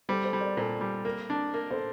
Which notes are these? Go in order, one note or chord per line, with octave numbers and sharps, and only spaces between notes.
G3 A4 C5
A4 C5
G3
A#4 D5
A#2 A4 C5
G3
A#3
D4
A#3
A4 C5